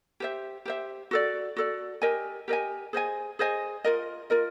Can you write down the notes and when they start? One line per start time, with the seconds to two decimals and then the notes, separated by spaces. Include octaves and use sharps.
0.20 G4 C5 E5
0.66 G4 C5 E5
1.11 F#4 A4 D5
1.56 F#4 A4 D5
2.02 G4 A#4 D#5 G#5
2.48 G4 A#4 D#5 G#5
2.93 G#4 C5 D#5 G#5
3.39 G#4 C5 D#5 G#5
3.84 F4 A#4 D#5
4.30 F4 A#4 D#5